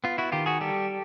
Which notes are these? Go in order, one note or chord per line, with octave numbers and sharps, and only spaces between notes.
B3 F4
E4 F#4
D#3 F4 G4
F#4 G#4
G3 G4 A4